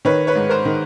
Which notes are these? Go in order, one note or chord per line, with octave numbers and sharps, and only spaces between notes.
D#3 B4 C#5
B4 C#5
G#2
A#4 C5
D#3